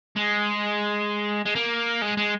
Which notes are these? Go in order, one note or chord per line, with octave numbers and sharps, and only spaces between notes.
G#3
G#3
A#3
G#3
G#3